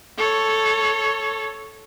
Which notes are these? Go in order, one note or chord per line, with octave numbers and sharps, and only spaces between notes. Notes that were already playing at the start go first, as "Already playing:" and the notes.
A4 C#5